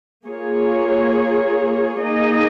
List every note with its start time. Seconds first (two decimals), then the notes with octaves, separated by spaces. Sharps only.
0.25 A#3 F4 G#4 C#5
2.02 A#3 D#4 G#4 D#5